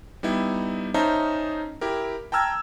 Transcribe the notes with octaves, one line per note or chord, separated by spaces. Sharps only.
G3 B3 D#4 E4
C#4 D#4 C5 E5 A5 A#5
E4 G4 A#4
G5 A5 A#5 E6 F6 G#6